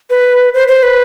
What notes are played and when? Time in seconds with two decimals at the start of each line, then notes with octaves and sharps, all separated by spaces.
0.10 B4
0.54 C5
0.68 C5
0.83 B4